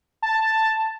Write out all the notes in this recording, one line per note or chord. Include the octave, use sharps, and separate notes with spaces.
A5